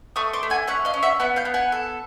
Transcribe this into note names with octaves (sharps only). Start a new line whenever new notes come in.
A3 C#6 D#6
C6 D6
A3
F#5 G#5
C#4 E5 F#5
D#5 F5
C#4
E5 F#5
B3 E5 F#5
F5 G5
B3
F#5 G#5
A4